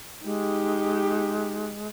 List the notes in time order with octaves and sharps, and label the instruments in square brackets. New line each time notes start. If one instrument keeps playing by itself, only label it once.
[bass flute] G#3 [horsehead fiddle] D#4 G4